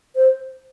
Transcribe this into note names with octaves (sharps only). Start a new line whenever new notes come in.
C5